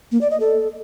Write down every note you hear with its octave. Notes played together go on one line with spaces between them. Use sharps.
A#3
D5
D#5
A4